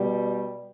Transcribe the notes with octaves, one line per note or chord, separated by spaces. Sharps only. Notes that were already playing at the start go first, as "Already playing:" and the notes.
Already playing: B2 G3